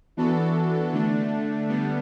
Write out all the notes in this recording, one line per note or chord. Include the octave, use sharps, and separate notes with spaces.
E3 B3 D4 F#4 A4
D3 A3 D4
D3 G3 B3 D4